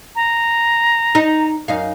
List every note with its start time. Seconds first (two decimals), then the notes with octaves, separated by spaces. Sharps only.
0.16 A#5
1.15 D#4
1.68 F#2 D#4 F5